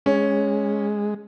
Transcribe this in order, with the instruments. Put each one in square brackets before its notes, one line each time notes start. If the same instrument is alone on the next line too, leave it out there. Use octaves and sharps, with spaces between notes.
[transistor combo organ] G#3 [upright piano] C#4